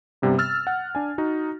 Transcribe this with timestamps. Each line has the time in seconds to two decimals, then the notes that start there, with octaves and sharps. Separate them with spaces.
0.22 G2 C3 G3 B3
0.39 E6 F6 A6
0.67 F#5
0.95 D4 G#5
1.18 D#4 F#4